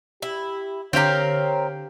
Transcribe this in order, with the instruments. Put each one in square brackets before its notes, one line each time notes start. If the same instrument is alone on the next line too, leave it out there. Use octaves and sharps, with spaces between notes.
[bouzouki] E4 [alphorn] G4
[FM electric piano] D3 [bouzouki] C4 A#4 [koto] G4 F5 G5 [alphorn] C#5